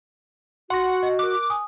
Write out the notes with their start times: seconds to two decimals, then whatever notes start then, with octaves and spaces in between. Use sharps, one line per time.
0.70 F#4 F#5 C6 C#6 A#6
1.03 D#5
1.19 A#4 D6 F#6
1.50 G#5 D#6